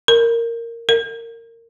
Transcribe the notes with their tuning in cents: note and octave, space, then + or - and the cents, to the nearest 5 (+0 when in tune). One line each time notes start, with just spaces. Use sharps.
A#4 -10
A#4 -20